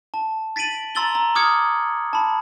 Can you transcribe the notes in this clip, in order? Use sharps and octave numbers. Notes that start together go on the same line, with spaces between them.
A5
A6 B6 D7 D#7 F#7
A#5 C6 E6 A6 F#7 G7
A#5
D6 D#6 F6 G#6 C#7
A5 B5